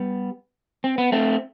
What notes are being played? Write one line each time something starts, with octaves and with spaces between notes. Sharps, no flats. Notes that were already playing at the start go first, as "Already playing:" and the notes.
Already playing: G3 B3
C4
B3
A3 C4